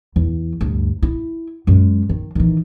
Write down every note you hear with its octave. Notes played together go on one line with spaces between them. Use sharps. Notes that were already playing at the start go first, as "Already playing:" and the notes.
E2
D2 G2
E4
F#2 G#3
D#3
D#3 E3